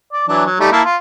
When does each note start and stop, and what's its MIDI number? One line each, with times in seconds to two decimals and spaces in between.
0.13 0.26 74
0.28 0.44 52
0.28 0.44 54
0.28 0.44 62
0.46 0.56 54
0.60 0.71 55
0.60 0.71 57
0.60 0.71 63
0.72 0.81 58
0.72 0.81 64
0.72 0.81 81
0.84 0.96 65